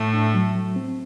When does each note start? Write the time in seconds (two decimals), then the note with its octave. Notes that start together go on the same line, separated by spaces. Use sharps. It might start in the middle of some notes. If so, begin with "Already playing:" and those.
Already playing: A2 A3
0.13 D4
0.34 F#3
0.55 F#3
0.76 C4